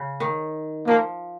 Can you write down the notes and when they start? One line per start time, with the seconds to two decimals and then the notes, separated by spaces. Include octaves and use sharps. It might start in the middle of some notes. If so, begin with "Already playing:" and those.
Already playing: C#3
0.20 D#3
0.87 F3 A#3